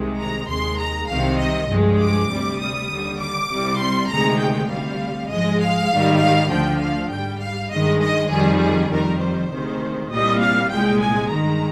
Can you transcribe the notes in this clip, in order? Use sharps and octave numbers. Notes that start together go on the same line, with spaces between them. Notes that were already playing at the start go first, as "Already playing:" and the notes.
Already playing: C2 C3 D#3 G#3
A#5
D#2 D#3 G#3 C6
A#5
C2 C3 D#3 F5
D#5
G2 F3 G#3
D6
D2 C3 G3
D#6
D#2 D3 G3
D6
C2 C3 G3
C6
D2 C3 D#3 G#3 A#5
G5
D2 C3 G3 F5
G#2 F3 G#3 D#5
F5
G#2 D#3 G3
F5
D2 D3 F3 G5
F5
G#2 G3 G5
F5
G2 D#3 G#3 D#5
D#5
F2 D#3 G3 G#4
G#4
F2 D#3 G3 A#4
C5
D2 C3 D#3 G#3
C2 A#2 G3 D#5
F5
C2 A#2 G#3 G5
G#5
G2 D#3 G#3 A#5